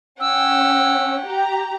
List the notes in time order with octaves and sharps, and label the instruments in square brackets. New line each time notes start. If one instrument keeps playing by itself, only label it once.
[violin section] C#4 [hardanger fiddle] F#5 G5 [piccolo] E6
[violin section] G4 A#5